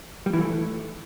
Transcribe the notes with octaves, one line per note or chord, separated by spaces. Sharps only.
G3
E3
A3